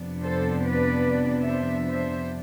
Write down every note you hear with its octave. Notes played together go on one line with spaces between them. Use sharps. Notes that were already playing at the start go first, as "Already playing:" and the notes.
Already playing: F2 C3 F3 B3 D4
A4 C5
B4 D5
C5 E5
C5 E5